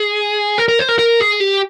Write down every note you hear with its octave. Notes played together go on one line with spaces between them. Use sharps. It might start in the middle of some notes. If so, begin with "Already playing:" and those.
Already playing: G#4
A#4
A#4
C5
A#4
A#4
G#4
G4